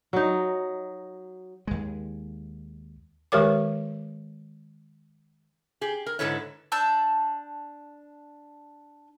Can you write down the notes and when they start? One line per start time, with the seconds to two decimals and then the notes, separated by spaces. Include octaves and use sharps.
0.13 F#3 D#4
1.67 D#2 G#3
3.32 D#3 G#3 G4 A#4 C#5 D6
5.81 G4 G#4
6.06 A#4
6.19 G#2 D3 E4 A4 B4 C#5
6.72 D4 A5 E6 G6